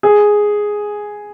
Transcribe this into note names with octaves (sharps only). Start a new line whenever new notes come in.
G#4